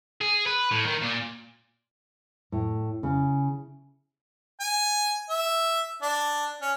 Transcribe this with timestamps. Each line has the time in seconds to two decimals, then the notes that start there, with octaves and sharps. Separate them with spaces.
0.21 G#4
0.46 B4
0.71 A2
0.86 D#3
1.01 A#2
2.52 A2
3.03 C#3
4.60 G#5
5.29 E5
6.02 D4
6.61 C#4